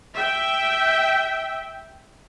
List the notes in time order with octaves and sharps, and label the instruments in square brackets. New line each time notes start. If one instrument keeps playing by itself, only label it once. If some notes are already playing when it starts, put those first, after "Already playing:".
[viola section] E5 G5